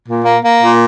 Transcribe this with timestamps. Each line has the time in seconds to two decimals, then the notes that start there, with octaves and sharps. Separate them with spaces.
0.07 A#2
0.25 A#3
0.43 A#3
0.61 A#2